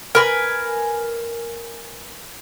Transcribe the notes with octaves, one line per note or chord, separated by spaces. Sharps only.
A#4 B4 G#5